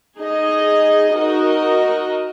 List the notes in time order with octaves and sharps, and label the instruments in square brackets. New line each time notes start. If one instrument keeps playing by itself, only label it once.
[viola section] D#4 G#4 D#5
D#4 F#4 A#4 D#5